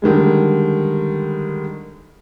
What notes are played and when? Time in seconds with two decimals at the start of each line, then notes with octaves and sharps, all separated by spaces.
0.02 D3 D#3 G3 G#3